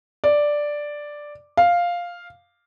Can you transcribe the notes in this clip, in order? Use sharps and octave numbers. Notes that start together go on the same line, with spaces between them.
D5
F5